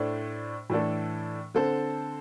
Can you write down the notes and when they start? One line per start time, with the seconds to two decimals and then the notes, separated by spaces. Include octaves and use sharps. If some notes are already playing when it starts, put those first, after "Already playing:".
Already playing: A2 A3 D4 C5
0.70 A2 E3 A3 D4 A4
1.54 D3 C4 A4 C5